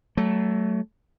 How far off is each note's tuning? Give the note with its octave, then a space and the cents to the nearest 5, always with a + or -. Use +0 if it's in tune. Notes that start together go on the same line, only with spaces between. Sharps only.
F#3 +30 A3 +0